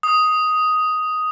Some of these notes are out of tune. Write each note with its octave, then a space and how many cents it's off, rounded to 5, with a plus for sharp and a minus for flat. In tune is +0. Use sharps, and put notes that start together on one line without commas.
D#6 +5